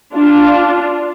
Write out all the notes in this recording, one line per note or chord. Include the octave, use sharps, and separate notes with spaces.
D4 F4